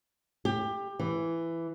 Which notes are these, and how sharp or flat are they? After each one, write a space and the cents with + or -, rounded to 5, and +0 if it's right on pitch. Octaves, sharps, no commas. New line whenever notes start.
G4 +20
E3 +10